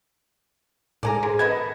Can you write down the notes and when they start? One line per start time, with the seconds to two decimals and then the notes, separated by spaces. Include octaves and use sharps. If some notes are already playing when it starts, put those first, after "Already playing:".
1.03 A2 G#3 A4 A#4 D5 G#5 A#5
1.23 G#4 A#4 C5
1.39 B3 A4 B4 D#5 F#5 G#6